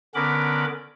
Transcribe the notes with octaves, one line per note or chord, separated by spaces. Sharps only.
D3 B3 C#4 A#4 B5 D6